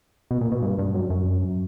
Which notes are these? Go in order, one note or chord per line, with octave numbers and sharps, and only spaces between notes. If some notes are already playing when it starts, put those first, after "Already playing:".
B2
A#2
B2
G2
G2
F#2
F#2